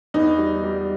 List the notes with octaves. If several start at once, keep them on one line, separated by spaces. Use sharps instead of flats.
E2 D#4
G3
G3